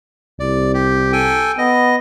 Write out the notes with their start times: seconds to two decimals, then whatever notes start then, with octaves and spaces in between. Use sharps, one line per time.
0.40 C2 D5
0.74 G4
1.13 A4 G5 G#5
1.58 B3 D#5